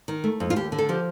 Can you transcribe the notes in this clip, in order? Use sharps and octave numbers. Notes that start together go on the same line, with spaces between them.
D#3
A3
F2
F4
D#2 G4
D3
A4
F3 G4